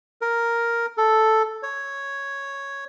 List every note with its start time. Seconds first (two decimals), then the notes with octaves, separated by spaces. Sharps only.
0.21 A#4
0.97 A4
1.63 C#5